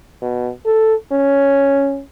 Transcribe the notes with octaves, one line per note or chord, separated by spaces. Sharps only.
B2
A4
C#4